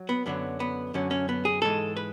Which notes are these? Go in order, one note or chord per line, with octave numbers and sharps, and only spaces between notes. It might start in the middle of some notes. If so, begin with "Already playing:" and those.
Already playing: F#3
B3
F#2 D3 F#3 B3
B3
F#2 D3 F#3 C#4
C#4
B3
G#4
G#2 E3 G#3 A4
B4